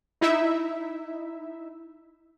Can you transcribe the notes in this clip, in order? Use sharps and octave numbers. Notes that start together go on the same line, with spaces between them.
D#4 E4 E5